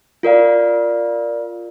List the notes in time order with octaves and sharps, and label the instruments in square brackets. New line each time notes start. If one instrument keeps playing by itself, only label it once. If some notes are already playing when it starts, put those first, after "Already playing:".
[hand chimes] F4 A#4 D5 F5